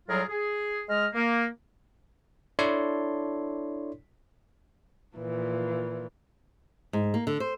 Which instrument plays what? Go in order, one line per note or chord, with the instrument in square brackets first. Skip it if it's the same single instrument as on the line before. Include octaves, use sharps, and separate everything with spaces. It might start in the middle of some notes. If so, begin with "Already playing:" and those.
[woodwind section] A2 F#3 G3 F4 G#4 A#4
G#4
G#3 D#5 F6
A#3
[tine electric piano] D4 E4 A4 C#5 D5 C6
[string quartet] A#2 E3 F3
[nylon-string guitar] G#2
A#3
D3
C5